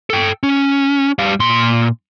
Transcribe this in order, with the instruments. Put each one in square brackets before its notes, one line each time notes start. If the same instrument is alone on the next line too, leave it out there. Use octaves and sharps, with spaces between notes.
[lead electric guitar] A4 G5
C#4
G3 F5
A#2 C6